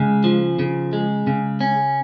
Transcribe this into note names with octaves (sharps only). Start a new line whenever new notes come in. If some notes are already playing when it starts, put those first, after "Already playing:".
Already playing: C#3 G#3
F3
C#3
G#3
C#3
C#4